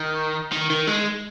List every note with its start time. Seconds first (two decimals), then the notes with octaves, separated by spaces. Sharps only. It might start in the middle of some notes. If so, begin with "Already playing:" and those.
Already playing: D#3
0.52 D#3
0.70 D#3
0.87 G#3